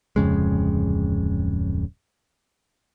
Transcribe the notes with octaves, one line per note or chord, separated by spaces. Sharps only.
D1 F2 C#3 G#3